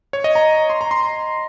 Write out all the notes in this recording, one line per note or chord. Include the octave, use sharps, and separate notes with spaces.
C#5
D#5
A#5
C6
A#5
C6